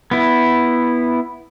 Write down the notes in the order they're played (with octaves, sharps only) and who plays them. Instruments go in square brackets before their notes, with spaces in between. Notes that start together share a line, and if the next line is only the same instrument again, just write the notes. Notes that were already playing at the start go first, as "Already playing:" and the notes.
[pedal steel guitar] B3 E4